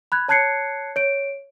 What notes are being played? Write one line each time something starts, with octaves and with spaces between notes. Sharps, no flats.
B5 F#6 G#6
C#5 A5 F#6 G#6 C7 C#7
C#5 D7